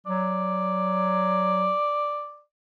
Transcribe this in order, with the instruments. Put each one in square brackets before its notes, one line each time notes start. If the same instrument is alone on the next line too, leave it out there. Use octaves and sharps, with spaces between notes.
[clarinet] F#3 [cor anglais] D5